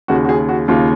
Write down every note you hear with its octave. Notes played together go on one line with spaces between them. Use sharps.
D#2 C#3 F#4
F#4
G#4
F#4
D#2 C#3 F4